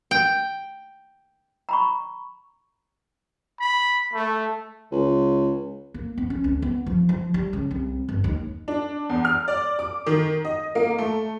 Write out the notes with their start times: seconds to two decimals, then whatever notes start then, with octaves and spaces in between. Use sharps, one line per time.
0.11 G5
1.69 A#5 B5 C#6
3.60 B5
4.14 A3
4.91 C#2
5.94 A#3
6.18 B3
6.30 C#4
6.44 D2
6.62 B3
6.86 F3
7.09 F3
7.34 G3
7.53 C#3
7.71 C2
8.09 G1
8.24 D#2
8.68 D4
9.09 E2
9.25 F6
9.48 D5
9.79 D6
10.06 D#3
10.45 D#5
10.75 A#3
10.98 A3